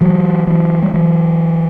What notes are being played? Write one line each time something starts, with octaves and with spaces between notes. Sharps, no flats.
E3 F#3
E3 F#3
G3
E3 F#3